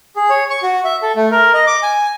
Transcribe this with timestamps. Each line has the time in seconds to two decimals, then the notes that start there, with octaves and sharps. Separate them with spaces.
0.16 G#4
0.30 C#5
0.50 C#6
0.63 F#4
0.85 E5
1.02 A4
1.16 A3
1.31 A#4
1.54 D#5
1.67 D6
1.83 G#5